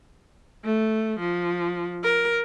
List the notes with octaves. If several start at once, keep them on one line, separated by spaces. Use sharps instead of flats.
A3
F3
A#4